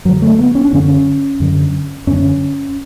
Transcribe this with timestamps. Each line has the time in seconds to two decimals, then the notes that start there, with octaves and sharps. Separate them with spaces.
0.05 F#2 D3 F#3
0.22 A3
0.38 B3
0.55 C#4
0.65 D4
0.73 F#2 D3 C#4
1.40 F#2 D3
2.07 F#2 D3 C#4